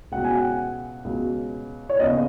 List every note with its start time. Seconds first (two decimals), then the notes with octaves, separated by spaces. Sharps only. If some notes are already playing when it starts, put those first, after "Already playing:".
0.12 C#2 B2 F#3 F#5
0.24 G#5
0.36 F#5
1.05 C#2 B2 F#3
1.89 C#5
1.99 D#2 C#3 B3 D#5